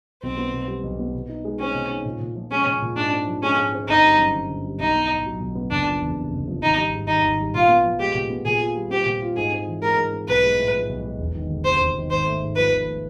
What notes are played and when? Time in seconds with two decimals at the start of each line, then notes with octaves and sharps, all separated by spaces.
0.23 B1 C4
0.37 B3
0.53 B2
0.68 G3
0.83 B1
0.99 B3
1.14 B2
1.29 D#4
1.45 G#3
1.59 C4 C#4
1.74 B2
1.91 D#4
2.05 A#2
2.20 A#2
2.36 F3
2.51 G#3 C#4
2.66 A#2
2.82 A#2
2.96 G#2 D4
3.12 C4
3.27 F3
3.43 G#3 C#4
3.58 G#2
3.72 C4
3.88 G1 D#4
4.04 G3
4.19 F#2
4.34 D3
4.49 G1
4.65 G3
4.79 B1 D#4
4.95 B3
5.11 A2
5.26 F#3
5.40 B1
5.55 B3
5.71 F#1 D4
5.86 F3
6.02 E2
6.17 C3
6.32 F#1
6.48 F3
6.62 G#1 D#4
6.78 G3
6.92 G#2
7.07 D#3 D#4
7.24 G#1
7.39 G3
7.54 A#2 F4
7.69 B3
7.85 F3
7.99 G#3 G4
8.15 A#2
8.30 B3
8.45 A#2 G#4
8.60 F4
8.76 G3
8.90 C4 G4
9.06 A#2
9.22 F4
9.37 G#2 G#4
9.52 C4
9.67 E3
9.82 G#3 A#4
9.97 G#2
10.13 C4
10.28 B1 B4
10.43 G#3
10.58 A2
10.74 F3
10.89 B1
11.04 G#3
11.19 E1
11.35 D#3
11.49 D2
11.65 C3 C5
11.80 E1
11.96 D#3
12.10 G#1 C5
12.26 A3
12.42 G#2
12.56 F3 B4
12.72 G#1
12.87 A3